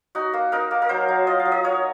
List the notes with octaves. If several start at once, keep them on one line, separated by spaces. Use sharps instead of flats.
D#4 F#4
A#3
D#4 A#4
A#3
A#4
F#3 C5
F#3
F4 D#5
F5
F#3
D#5
F4 C#5